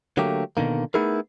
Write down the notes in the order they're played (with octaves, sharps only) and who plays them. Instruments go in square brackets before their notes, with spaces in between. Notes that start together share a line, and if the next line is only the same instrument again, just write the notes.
[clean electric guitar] D3 F#3 A3 A#3 G4
B2 D3 D#3 A#3
A3 B3 D#4 E4 G#4 A#4